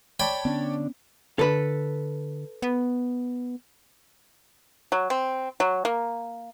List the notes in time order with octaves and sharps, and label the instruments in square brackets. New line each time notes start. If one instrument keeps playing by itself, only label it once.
[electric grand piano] C#5 D5 A5 [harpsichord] G5 B5
[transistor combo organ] D3 D4 [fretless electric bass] B3 C#4
[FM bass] D3 [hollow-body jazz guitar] A4 B4
[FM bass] B3
[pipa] F#3
C4
F#3
A#3